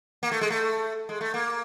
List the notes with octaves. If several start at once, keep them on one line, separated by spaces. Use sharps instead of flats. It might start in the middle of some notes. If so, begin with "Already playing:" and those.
A#3
A3
G#3
A3
G#3
A3
A#3